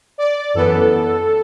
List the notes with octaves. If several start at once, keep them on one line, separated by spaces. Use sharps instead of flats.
D5
F#2 E3 B3 A4